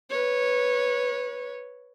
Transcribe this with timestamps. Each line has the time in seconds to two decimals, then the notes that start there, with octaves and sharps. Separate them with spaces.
0.10 B4 C#5